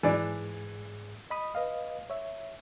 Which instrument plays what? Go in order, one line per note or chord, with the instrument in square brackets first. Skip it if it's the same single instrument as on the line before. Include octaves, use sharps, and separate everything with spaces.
[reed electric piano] G#2 G#4 [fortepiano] E3 D4
[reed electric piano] D#5 B5 D#6
B4 D#5 F5
C#5 E5